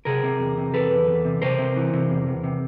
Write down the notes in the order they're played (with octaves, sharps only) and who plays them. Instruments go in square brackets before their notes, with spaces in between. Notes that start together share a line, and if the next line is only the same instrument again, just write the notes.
[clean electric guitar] C3 G#4 A#4
C3
E2
C3
E2 A4 B4
E2
E2
C3
C3 A#4 C5
C3
E3
C3
E2
E2
C3